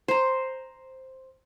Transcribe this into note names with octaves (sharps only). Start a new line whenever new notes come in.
C5 A#5